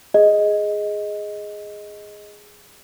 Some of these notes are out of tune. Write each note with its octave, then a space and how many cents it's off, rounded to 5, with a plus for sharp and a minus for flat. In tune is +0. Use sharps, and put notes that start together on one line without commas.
G#4 +0 D#5 +5